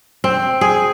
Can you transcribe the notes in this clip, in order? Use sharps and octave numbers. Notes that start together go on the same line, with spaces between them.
C4
G#4